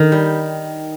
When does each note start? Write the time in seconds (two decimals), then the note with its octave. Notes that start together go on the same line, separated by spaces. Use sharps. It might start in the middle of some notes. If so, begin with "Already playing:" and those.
Already playing: D#3
0.12 G3